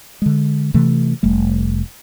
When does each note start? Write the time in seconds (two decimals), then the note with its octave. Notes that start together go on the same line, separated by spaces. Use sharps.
0.22 D3 G#3
0.74 C3 E3 A3
1.23 F1 G3 A3